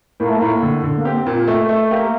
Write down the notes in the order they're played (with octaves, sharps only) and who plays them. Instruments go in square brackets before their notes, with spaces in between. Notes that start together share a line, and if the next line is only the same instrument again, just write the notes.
[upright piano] A2 [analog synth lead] A#3
[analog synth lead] A3
[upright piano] A2 [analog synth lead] A#3
[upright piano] D3
D3
[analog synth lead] A#3
[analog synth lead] C4 [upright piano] G4
[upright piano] A#2
A3
A3
[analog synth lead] A#3 [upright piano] G4